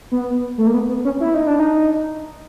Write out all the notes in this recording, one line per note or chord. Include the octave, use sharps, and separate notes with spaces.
B3
A3
A#3
B3
B3
C#4
E4
D#4
D4
D#4